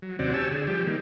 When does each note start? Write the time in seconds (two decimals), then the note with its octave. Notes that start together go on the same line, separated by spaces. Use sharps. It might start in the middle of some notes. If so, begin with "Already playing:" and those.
0.02 F#3
0.19 D#2 C3 C4 C#4 F#4 D5
0.34 G4 C#5 G#5 A5 E6
0.51 D3 G#4
0.67 F3 G3 G4
0.87 D#3 G3 A#3